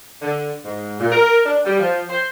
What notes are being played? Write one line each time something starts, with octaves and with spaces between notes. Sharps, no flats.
D3
G#2
A#2
A#4
D4
G3
F3
C5